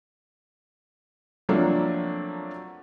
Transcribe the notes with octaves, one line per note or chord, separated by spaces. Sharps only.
F3 F#3 A3 A#3 C4 D4